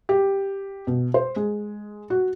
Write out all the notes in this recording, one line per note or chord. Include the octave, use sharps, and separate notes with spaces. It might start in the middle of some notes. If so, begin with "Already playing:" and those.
G4
B2
C5
G#3
F#4